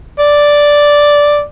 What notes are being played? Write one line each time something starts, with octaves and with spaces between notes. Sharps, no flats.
D5